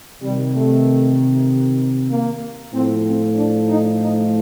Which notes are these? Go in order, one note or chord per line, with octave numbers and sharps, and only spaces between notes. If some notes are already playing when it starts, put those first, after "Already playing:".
C3 D#3 G3
A3
A#3
A2 F3 C4
C4
D4
D#4
D#4